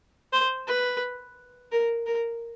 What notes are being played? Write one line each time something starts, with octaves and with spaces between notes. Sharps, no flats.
C5
B4
A#4
A#4